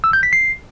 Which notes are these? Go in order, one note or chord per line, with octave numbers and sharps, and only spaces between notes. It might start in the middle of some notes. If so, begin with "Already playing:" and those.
E6
G6
B6
C7